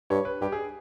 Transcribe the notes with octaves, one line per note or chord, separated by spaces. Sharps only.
G2 C#5
B4
G2 G4
G#4